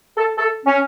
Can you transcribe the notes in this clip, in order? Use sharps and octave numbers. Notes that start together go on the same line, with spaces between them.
A4
A4
C#4